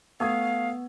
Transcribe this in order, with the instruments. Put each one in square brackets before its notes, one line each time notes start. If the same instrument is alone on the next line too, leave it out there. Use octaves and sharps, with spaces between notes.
[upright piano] A3 D#6 G#6 [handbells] B3 [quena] F5